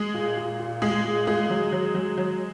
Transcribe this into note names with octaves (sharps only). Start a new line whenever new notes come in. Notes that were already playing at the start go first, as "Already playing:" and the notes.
Already playing: G#3 G#4
A#2
A#2
A#2
A#2 G#3 G#4
A#2
A#2 G#3 G#4
F#3
F#3
F#3
F#3